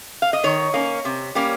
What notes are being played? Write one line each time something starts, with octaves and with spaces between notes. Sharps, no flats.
F5
D#5
D#3 C#5
A#3 C#4
C3
G3 A#3 C#4